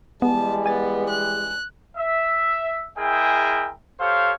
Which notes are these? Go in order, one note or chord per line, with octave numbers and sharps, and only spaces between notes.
E3 G3 G#3 B3 A5
B3 G#5 A6
F#6
E5
G#3 E4 G#4 A#4 E5 G5
G4 A4 C5 C#5 F5